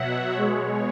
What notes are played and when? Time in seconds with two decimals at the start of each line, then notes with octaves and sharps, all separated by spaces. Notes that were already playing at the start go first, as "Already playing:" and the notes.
Already playing: B2 F#3 E5 F#5
0.35 B2 G#3 C#5